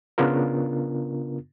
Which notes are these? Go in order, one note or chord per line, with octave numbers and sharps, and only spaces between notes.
C#3 B3 D4 F4 A#4